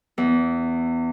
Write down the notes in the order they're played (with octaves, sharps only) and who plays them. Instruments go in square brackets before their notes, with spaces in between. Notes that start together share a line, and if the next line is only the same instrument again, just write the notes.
[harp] E2